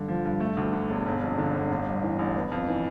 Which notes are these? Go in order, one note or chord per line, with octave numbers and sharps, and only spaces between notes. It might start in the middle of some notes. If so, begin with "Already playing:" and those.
Already playing: G2 D3
F3
G2
A3
D2
D3
E1
G1
F2
D3
G1
A1
G2
E3
A1
B3
F2
E3